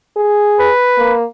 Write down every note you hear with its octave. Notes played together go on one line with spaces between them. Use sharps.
G#4
B4
A#3